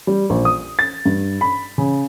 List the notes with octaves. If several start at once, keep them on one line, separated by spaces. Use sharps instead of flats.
G3
A#1
D#6
A6
G2
B5
C#3